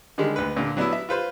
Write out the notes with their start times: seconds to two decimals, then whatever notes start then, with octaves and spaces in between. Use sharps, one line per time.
0.18 D3 D#3 G3 G#3
0.36 D2 B4
0.56 A#2 D3
0.77 F#3 B3 D4 E4
0.93 E5
1.09 F4 B4 C5